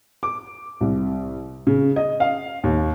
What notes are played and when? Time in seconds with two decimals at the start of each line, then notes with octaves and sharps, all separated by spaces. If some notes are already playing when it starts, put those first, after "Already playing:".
0.23 D6
0.81 C2
1.67 C#3
1.96 D#5
2.20 F5
2.64 D#2